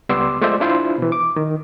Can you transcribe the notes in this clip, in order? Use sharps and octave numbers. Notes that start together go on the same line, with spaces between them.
C#2 G3 B3 C6 D6 E6
G#3 A3 F4 C5 D5 E5
D4 E4 F4 C5
B2 E3
D6
D#3